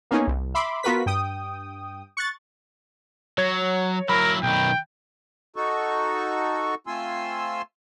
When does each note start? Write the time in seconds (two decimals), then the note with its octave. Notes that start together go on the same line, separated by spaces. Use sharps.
0.11 A#3 B3 C#4 D#4 G#4
0.27 C2
0.55 E5 B5 C6 D6
0.83 B3 F4 F#4 A#4 B4 B6
1.06 G2 G5 D#6
2.17 C#6 F#6 A6
3.38 F#3 C#5 G#6
4.09 F#3 E4 A#4 B5
4.43 B1 D#3 G5
5.56 D#4 F#4 A4 C#6
6.87 A3 C4 F4 G#5 C6 E6